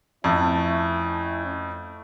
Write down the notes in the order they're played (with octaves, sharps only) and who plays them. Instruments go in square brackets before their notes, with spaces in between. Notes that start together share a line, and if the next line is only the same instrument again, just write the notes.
[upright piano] F2 [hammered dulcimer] A3 [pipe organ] C#4 E4